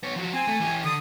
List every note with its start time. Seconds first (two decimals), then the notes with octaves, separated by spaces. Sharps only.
0.03 B3 C#5
0.17 F3 F#4
0.34 C4 G#5
0.48 A3
0.60 E3 G4
0.84 D3 D#6